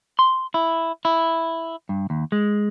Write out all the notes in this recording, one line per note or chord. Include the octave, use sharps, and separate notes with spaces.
C6
E4
E4
G2
D#2
G#3